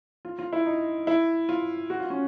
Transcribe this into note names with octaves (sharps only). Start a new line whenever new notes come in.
F4
F4
E4
D#4
E4
F4
F#4
F4
C#4